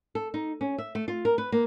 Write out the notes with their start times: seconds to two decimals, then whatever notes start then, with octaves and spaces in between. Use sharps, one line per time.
0.15 A4
0.34 D#4
0.61 C#4
0.78 E5
0.95 A3
1.08 F4
1.25 A#4
1.38 B4
1.52 A#3